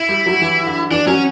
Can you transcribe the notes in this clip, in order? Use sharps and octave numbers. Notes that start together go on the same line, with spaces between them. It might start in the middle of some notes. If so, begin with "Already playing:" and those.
Already playing: E4
G3
F#3
E3
D3
E3 D4
F#3 C#4